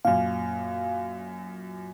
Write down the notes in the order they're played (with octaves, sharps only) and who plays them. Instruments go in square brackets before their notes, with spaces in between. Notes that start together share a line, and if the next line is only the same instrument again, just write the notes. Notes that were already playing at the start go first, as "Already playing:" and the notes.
[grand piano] F#2 A#2 [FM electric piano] F5